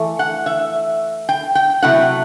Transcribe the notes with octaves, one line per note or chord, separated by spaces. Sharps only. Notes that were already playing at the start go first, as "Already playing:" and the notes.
Already playing: E3 A3
F#5
E5
G5
G5
C3 F#3 A3 E4 F#5